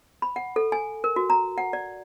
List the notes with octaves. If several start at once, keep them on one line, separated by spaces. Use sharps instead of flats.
B5
F#5
A4
G#5
A#4
F#4
A#5
F#5
D5